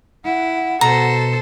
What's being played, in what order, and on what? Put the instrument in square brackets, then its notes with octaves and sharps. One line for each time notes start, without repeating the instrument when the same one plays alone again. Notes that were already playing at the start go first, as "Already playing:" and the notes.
[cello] E4 [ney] F#5
[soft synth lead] B2 [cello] A4 C5 [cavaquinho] A#5